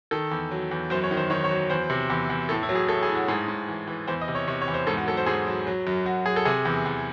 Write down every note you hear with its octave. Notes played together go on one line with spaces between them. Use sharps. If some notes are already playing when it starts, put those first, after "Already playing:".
D#3 A4
E2
F#3
E2
F#2 C5
C#5
D#3
C5
D#3 C#5
C#5
F#3
E2 C5
C3
E2
E2
A2 A4
E4
F#3
G#4
A2 A4
G#4
A2
F#4
G#2 G#4
G#2
E3
E3
E2 C5
D#5
C3
C#5
C3 C#5
C#5
E2
C5
G#2 A4
F#4
F#3 A4
C5
G#2 G#4
F#3
F#3
F#2
F#2 F#4
F#3 G#4
A4
C3 G#4
E2
E2